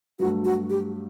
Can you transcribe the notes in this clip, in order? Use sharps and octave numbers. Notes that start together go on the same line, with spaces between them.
G2 F#3 A3 F#4
F#4
G4